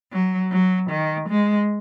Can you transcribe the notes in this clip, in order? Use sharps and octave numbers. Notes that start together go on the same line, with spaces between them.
F#3
F#3
D#3
G#3